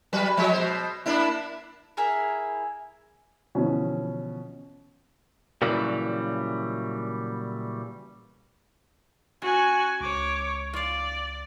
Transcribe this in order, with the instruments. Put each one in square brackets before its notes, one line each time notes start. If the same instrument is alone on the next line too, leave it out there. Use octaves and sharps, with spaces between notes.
[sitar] F#3 B4
F3 G#3 C#5
B2 C5
A#3 D4 E4
[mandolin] E4 G#4 A#4
[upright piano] B2 D3 E3 F3 C#4 E4
[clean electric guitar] A#2 C#3 E3 F#3 G3
[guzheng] C#4 [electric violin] F#4 G#5
[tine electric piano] C#2 [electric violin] C#5 D6
[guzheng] F4 F5 [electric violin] D5